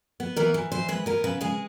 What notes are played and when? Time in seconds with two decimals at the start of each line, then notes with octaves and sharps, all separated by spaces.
0.20 B3
0.36 E3 A#4
0.54 E3
0.72 E3 C5
0.88 G#3 B4
1.06 B3 A#4
1.24 C#3 B4
1.41 G#3 G#4